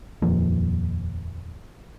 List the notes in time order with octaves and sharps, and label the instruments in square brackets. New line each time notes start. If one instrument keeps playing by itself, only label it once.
[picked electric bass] D#1 F2 F3 A#3